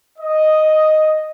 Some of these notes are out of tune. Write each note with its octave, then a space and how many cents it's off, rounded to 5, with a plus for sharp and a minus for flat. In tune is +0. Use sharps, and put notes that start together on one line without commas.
D#5 +0